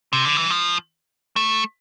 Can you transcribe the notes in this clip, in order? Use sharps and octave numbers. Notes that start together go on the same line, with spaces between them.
C3
D3
E3
F3
A3